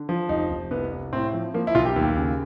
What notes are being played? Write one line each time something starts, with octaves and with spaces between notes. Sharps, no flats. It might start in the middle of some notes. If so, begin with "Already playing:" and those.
Already playing: D3
F3
F1 D#4
F1
C2 B3
C2
A2 C4
F3
F3 A#3
E4
B1 F4
G4
D#2
C#3